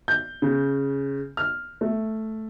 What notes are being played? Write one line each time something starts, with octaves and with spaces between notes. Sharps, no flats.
G6
C#3
F6
A3